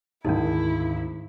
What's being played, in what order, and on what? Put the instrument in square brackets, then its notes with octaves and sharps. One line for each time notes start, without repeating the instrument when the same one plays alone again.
[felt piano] G#1 G#4 [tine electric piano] D2 G#2 D#3 [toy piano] C#4 D#4 [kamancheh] E4